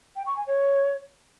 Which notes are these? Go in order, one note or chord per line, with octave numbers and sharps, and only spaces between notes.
G5
C#6
G#5
C#5